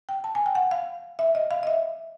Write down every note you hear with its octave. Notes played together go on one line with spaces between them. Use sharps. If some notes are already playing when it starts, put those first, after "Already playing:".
G5
A5
G#5
G5
F#5
F5
E5
D#5
F5
D#5
E5